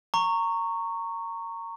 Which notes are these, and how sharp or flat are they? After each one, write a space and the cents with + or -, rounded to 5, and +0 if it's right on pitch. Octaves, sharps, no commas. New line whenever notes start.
A#5 -20 C#6 +0